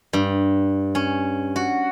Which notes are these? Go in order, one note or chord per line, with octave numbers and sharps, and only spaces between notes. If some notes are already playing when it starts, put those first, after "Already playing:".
G2
C#4
F#4